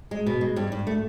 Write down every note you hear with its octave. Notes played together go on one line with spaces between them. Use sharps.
G#3
B2
G#3
G2
G2
A3